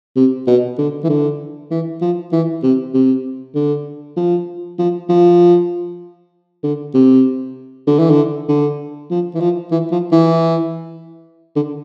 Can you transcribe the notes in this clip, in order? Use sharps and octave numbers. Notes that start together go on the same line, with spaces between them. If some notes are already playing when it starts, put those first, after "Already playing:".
C3
B2
D3
E3
D3
E3
F3
E3
C3
C3
D3
F3
F3
F3
D3
C3
D3
E3
D3
D3
F3
E3
F3
E3
F3
E3
D3